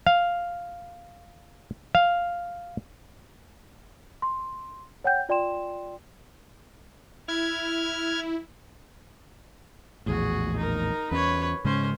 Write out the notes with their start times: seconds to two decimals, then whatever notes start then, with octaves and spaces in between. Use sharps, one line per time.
0.07 F5
1.95 F5
4.22 C6
5.04 C#5 F#5 G5 G6
5.29 F4 D5 G5 C6 E7
7.28 E4 F6 G#6
10.06 A#1 E2 A2 F#4 G#4
10.57 D#4 A#4
11.11 E2 C#4 B4 C#5
11.65 G#2 C#3 G#3 C#4 C5